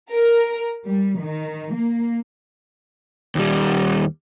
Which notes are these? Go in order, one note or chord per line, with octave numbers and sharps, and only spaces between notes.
A#4
G3
D#3
A#3
D#2 G3